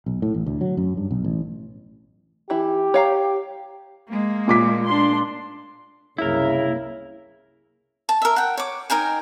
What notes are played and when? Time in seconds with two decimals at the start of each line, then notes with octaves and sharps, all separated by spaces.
0.06 B1
0.22 A2
0.34 A1
0.46 D2
0.61 F#3
0.77 F#2
0.97 G2
1.11 B1
1.24 A1
2.50 E3 E4 G4
2.94 C#5 F5 A#5
4.09 G#3 A#3
4.48 A#2 D6 B6
4.88 D4 C6
6.18 C2 F#2 C#3 A#3 E4 A#4
8.09 A5
8.22 A#4 E5
8.36 F#5 G5
8.57 C#5 D6
8.90 D#4 A#4 G5 G#5